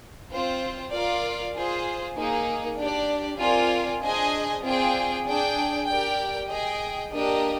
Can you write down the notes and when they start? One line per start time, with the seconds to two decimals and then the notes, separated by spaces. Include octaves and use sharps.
0.32 C4 F4 C5
0.93 F4 A#4 D5 F5
1.55 F4 G#4 C5
2.17 A#3 D#4 G#4
2.79 D4 G4 D5
3.40 C4 F4 A#4 D5 G#5
4.02 D4 G#4 C5 D#5 G#5
4.64 C4 F4 G#4 D5 G5
5.26 D4 G#4 D5 G5
5.88 G4 A#4 D5 G5
6.49 G#4 D#5 G5
7.12 A#3 D4 G4 A#4 D#5